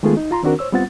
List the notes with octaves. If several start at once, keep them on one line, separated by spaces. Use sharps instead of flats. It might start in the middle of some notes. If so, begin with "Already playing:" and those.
D#3 G#3 A3 B3 F4 G#4
D#4
F4 A#5 C6
D#3 C4 D4 F#4 A#4
C5 C#5 E6
G3 B3 C4 F4 F#5 A6